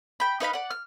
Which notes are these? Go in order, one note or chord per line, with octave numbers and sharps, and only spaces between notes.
G5 B5
D#4 B4 F5 B5
D5 F#5
F6